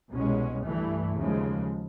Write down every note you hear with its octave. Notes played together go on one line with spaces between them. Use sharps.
C2 B2 G#3 C#4
G2 E3 A3
D#2 C#3 F3 G#3